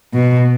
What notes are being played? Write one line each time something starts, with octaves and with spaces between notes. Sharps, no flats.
B2